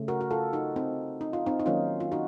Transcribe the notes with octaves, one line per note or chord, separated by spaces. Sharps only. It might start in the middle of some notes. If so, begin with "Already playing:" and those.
Already playing: C#3 A3
F#4 A#4
F#4
F4 A4
D#4 F#4
C4 D#4
D#4
F4
C4 D#4
D#4
D#3 F#3 A#3 C#4 F4
F4
D#4 F#4